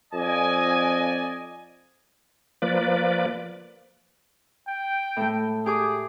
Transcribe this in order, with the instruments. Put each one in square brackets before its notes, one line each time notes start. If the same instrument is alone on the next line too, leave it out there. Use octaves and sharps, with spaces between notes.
[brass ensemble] F2 D5 D#5 G#5
[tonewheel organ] F3 A#3 B4 D5
[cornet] G5
[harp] A2 A3
[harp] G4 D6 [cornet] G#4